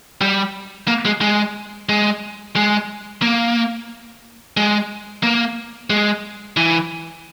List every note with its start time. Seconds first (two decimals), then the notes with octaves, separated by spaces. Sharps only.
0.21 G3
0.88 A#3
1.06 G#3
1.21 G#3
1.89 G#3
2.56 G#3
3.22 A#3
4.57 G#3
5.23 A#3
5.90 G#3
6.57 E3